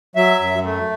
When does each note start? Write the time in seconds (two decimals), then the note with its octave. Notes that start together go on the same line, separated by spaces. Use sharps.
0.16 F#3 E5
0.40 F#2
0.64 A3